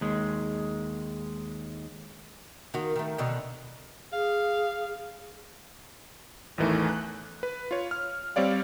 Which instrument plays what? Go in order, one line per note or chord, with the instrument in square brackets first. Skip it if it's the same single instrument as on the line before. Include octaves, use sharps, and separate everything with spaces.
[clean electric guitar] D#2 G#3
[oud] D#3 A#3 F#4
D#3 A3
B2 D3 D#3
[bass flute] G#4 [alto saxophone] F5
[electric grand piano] A1 E2 D#3 E3 A3
F#6
B4
F4 C#5
F6
G3 C4 C#5 D5 F5